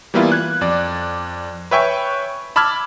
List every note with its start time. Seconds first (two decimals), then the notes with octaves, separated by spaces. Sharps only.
0.14 E3 G3 A#3 B3 E4 F4
0.32 F#6 G#6
0.61 F2 D5
1.71 B4 C#5 E5 G5 G#5 C#6
2.56 A5 B5 D6 E6 F6 G#6